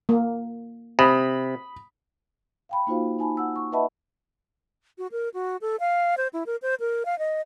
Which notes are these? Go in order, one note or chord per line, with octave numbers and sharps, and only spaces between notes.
A#3
C3 B5 D#6
F5 G5 B5
A#3 D#4 F4 F#4 C5 F5
D#4 G#5 A5 B5
F#5 E6
C#6
B4 D#5 E5 F#5 A5 B5
F#4
A#4
F#4
A4
F5
C5
E4
A#4
C5
A#4
F5
D#5